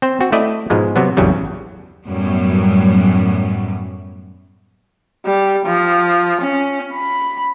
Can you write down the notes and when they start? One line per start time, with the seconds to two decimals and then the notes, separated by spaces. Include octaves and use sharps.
0.02 C4 C5
0.21 C4 F#4
0.32 A3 E4 D5 D#5
0.70 G#2 B2 F3 G#3
0.96 C3 F#3 B3
1.17 A1 E2 G2 C#3 F#3 G3
2.04 F#2 A2 F#3 G3 B3
5.26 G3
5.66 F3
6.41 C#4
6.93 B5